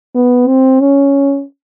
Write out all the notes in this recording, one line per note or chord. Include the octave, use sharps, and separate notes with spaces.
B3
C4
C#4